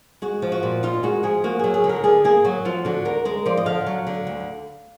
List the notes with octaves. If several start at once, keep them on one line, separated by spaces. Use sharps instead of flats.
G#3 F#4
F3
F#4
A#2
D#4 F4
G#3 F#4
F3 G#4
A#3 F#4
F#3 G#4
G#4
D3
A#4
D3 G#4
A#3 G#4
F#3 F#4
F3 F4
D3 F#4
D2 A#4
G#3 A#4
F3 D5
D#5
D3 F5
F#3
D3
D2